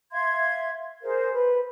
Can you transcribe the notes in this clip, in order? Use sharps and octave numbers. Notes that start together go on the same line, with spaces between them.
E5 F5 C6 G#6
G#4 A#4 C5
B4